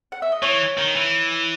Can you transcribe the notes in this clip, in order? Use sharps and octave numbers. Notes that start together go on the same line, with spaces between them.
F#5
E5
D#5
E3 C#5
D#3
E3